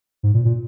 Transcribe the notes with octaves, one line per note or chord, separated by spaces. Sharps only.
G#2
A#2
A#2